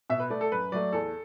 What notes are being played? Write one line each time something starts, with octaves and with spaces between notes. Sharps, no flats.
B2 E5
B4
A3 D5
A4
F#2 B4
F#3 A3 D5
E2 A4